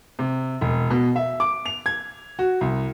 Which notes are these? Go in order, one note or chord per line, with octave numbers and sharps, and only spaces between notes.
C3
E1
B2
E5
D6
F7
G#6
F#4
C2